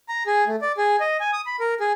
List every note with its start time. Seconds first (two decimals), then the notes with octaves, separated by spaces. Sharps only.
0.09 A#5
0.26 G#4
0.47 A3
0.62 D5
0.77 G#4
1.00 D#5
1.20 G#5
1.33 D#6
1.46 B5
1.60 A#4
1.80 G#4